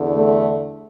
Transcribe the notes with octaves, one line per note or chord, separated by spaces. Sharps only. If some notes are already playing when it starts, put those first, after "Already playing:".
Already playing: E2 D3
A3